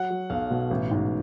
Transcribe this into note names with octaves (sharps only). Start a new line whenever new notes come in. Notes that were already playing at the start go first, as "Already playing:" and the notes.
Already playing: F#3 F#5
F#3
B1 F5
B2
A1
G#2